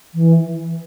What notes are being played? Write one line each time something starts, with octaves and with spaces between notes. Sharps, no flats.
E3